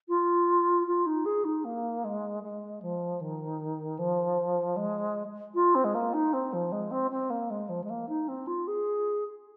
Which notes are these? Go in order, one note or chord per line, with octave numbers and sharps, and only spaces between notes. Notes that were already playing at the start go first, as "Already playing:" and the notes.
F4
F4
D#4
G#4
D#4
A#3
G#3
G#3
F3
D#3
F3
G#3
F4
C4
G#3
A#3
D#4
C4
F3
G#3
C4
C4
A#3
G#3
F3
G#3
A#3
D#4
C4
F4
G#4